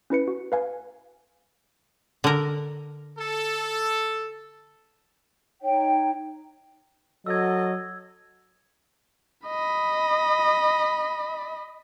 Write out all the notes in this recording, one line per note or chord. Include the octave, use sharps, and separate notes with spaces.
C#4 E4 B4 C#7
F#4
B4 F5 G#5
D3 A#4
A4
D#4 C#5 G5
F#3 F#4 A4 D#5 E6 G#6
D#5 B5